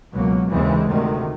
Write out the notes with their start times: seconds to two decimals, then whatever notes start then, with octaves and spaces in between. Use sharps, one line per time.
0.12 C#2 B2 F#3 A#3
0.50 D#2 C#3 E3 G#3 C4
0.88 D2 C3 D#3